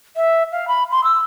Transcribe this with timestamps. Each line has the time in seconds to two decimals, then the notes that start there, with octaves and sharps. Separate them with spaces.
0.16 E5
0.52 F5
0.68 B5
0.91 C6
1.04 E6